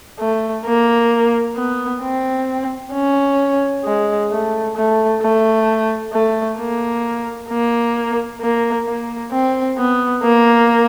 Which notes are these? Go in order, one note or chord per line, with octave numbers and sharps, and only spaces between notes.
A3
A#3
B3
C4
C#4
G#3
A3
A3
A3
A3
A#3
A#3
A#3
A#3
C4
B3
A#3